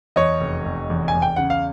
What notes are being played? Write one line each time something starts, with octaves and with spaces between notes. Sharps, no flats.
E2 C#5 D#5
F1
F1
E2
G#5
E2
G5
C#3 F#5
F5